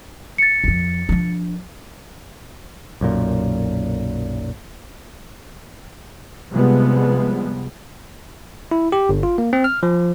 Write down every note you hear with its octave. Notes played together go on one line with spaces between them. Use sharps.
A6 C#7
F2 F3
F3 D4
B1 F#2 A#2
C3 F3 G3 G#3 B3
E4
G4
G1
F4
A#3
C4
F6
F3